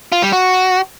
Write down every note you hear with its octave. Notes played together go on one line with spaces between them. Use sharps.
F4
G3
F#4